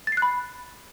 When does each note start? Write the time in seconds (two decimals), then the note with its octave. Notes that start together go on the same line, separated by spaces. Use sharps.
0.07 A6
0.12 C7
0.17 F#6
0.22 B5